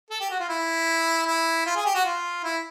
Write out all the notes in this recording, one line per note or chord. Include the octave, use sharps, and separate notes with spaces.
A4
G4
F#4
F4
E4
E4
F4
G#4
G4
F#4
F4
E4